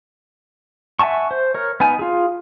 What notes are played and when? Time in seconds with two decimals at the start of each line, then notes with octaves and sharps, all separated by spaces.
0.99 E5 F#5 G#5 A5 C#6
1.31 C5
1.54 A#4 C#5
1.80 B3 D#4 G#5
1.99 F4 G#4